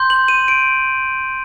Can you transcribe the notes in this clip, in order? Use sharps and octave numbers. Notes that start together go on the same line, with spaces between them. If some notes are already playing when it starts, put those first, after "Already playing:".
Already playing: C6 G6
F#7
D#7
D7